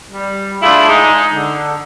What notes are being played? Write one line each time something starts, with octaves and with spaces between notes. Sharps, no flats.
G3
A3 D4 E4 F4 G#4
G#3 D#4
D3